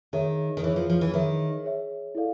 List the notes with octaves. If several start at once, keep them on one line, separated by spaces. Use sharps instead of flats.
D#3 G#4 C#5 E5
D#3
E3 G#4 C#5 E5
F3
F3
E3
D#3 G#4 C#5 E5
G#4 C#5 E5
E4 A4 D5 F5